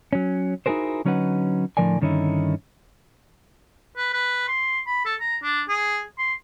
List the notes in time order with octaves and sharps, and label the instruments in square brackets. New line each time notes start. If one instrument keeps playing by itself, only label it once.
[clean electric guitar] F#3 C#4
D#4 E4 F#4 G#4 A#4 C5
D3 F#3 C#4 D#4 B4 F#5
A2 D3 F3 A#4 D5 G#5
G2 D3 D#3 C#4 D#4 E4
[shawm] B4
B4
C6
B5
A4
A#5
D4
G#4
C6